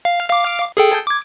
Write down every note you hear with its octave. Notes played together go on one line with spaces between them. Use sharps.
F5
F5 D6
G#4 A4 G5
D6 G#6